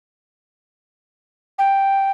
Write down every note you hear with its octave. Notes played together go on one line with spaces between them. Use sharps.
G5